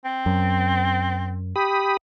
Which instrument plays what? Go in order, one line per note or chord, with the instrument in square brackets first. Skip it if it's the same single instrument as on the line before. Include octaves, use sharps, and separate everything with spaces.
[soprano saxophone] C4
[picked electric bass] F#2
[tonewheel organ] G4 B5 D#6